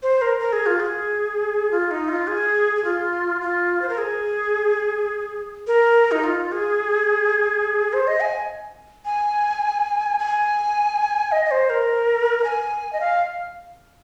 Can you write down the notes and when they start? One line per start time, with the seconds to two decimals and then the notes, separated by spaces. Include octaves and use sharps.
0.03 C5
0.22 A#4
0.39 A#4
0.53 G#4
0.66 F4
0.80 G#4
1.71 F4
1.91 D#4
2.09 F4
2.27 G#4
2.76 G#4
2.84 F4
3.41 F4
3.82 C5
3.89 A#4
3.98 G#4
5.67 A#4
6.12 D#4
6.24 F4
6.52 G#4
7.93 C5
8.07 D#5
8.20 G#5
9.05 G#5
10.19 G#5
11.32 D#5
11.46 D#5
11.51 C5
11.70 A#4
12.44 G#5
12.93 D#5
13.00 F5